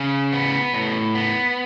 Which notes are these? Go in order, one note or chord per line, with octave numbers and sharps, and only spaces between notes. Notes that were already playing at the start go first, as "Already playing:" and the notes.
Already playing: C#3
B3
A2
B3